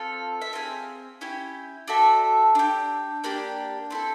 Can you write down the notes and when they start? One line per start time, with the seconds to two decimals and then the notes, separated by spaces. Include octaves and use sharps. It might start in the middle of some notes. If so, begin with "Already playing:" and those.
Already playing: C4 F4 A4
0.42 E5
0.53 C4 F4 G#4 F5
1.21 C#4 E4 G4
1.88 D4 F#4 A4 E5
2.55 D4 G4
3.24 A#3 D4 G4
3.90 C4 E4 A4